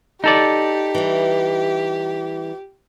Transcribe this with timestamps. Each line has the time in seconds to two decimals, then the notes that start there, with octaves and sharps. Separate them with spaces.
0.24 D#4 G4 A4 D5
0.95 E3 G3